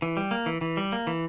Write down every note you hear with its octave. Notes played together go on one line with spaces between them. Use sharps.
E3
G3
A#3
E3
E3
G3
A#3
E3